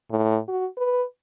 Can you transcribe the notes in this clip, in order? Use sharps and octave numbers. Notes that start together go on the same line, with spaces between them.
A2
F#4
B4